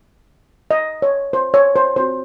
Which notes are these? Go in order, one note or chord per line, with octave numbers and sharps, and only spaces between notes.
D#5
C#5
C5
C#5
C5
C4 F#4 C5